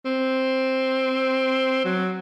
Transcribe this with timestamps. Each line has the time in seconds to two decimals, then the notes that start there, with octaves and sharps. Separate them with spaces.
0.05 C4
1.85 F#3